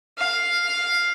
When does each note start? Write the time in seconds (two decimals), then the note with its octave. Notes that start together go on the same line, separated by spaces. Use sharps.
0.18 F5